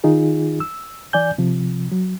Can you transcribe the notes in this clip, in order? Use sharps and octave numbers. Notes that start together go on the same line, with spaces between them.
D#3 D#4 F4 G#4
E6
E3 D5 G#5 G6
C3 F3
F#3